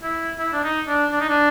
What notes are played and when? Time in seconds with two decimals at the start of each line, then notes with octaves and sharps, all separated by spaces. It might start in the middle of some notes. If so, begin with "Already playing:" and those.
0.03 E4
0.39 E4
0.53 D4
0.63 D#4
0.88 D4
1.12 D4
1.20 D#4
1.29 D4